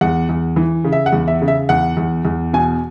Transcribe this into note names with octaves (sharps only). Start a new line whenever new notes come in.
E2 F#5
E2
E3
C#3
E5
F#5
E2
E5
C#3
E5
E2 F#5
E2
E2
B2 G#5